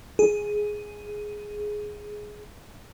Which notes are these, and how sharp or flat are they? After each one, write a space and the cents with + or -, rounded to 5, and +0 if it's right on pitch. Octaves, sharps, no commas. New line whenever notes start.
G#4 +5